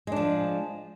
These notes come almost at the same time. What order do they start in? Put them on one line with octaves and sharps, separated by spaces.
G#3 D4 F3